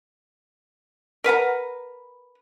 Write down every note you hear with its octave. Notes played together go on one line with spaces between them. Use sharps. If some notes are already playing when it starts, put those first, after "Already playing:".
A#4 B4 F#5 A#5